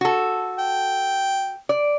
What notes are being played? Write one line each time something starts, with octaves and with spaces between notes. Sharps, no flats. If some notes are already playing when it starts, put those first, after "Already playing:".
F#4 A4
G5
D5